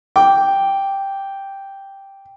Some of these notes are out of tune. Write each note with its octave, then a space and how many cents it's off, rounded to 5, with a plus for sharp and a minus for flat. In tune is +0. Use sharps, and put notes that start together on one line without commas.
G5 +0 D6 -10